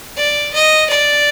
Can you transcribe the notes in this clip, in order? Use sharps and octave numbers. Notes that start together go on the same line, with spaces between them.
D5
D#5
D5